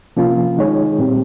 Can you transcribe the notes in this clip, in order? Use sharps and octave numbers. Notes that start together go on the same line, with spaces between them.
C3 F3 A#3 C#4 F4
D#3 G#3 D#4 G#4 C#5
A#2 G3 C4 G4